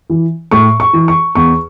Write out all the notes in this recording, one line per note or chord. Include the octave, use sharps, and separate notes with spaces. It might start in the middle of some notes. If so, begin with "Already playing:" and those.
E3
A2 C#6
C#6
E3
C#6
E2 C#6